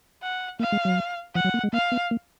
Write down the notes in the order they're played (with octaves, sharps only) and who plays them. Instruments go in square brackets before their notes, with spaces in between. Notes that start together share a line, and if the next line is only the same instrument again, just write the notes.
[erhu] F#5
[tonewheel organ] A#3 [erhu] F5
[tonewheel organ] G#3
F#3
[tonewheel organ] F3 [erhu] F#5
[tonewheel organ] F#3
A#3
G#3
[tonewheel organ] A#3 [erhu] F5
[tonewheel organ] B3
A#3